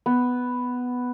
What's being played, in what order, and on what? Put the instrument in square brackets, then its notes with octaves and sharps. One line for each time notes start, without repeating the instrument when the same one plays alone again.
[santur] B3